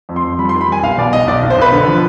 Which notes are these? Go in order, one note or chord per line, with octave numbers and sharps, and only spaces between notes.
F2
C6
F2
G3 B5
C6
D#3
B5
G3 G#5
B1 F5
B2 D5
B1 D#5
B1 D5
B1
C5
B1 B4
D3
F3